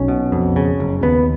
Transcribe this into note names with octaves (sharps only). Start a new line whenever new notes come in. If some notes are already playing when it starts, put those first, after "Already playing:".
Already playing: B1 C#4
B2
F2
C#3
F#1
D#2 B3